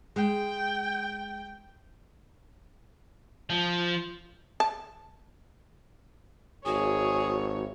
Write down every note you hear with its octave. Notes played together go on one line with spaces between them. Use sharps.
G#3 G5
F3
A5
G#1 F#4 G#4 C#5